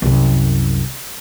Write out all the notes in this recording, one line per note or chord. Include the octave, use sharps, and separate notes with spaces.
C2 F#2